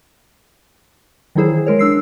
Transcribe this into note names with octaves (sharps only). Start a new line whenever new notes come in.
D#3 E3 F#3 E4 G#4 C5
G#3 A#4 C#5
D4 E6 C7